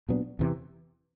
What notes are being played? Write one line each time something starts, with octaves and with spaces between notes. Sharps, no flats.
A#2 F#3 B3 D4
E2 C3 E3